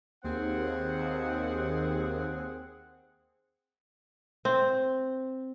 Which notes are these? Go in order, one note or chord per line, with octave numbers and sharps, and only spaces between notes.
D#2 C4 G#4 F#5
C4